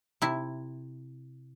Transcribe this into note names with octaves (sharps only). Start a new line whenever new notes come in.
C3 E4